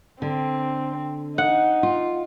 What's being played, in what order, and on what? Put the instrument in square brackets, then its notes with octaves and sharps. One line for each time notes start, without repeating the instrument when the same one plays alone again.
[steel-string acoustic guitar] D3 [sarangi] C4
[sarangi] D#4 [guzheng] F#5
[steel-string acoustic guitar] F4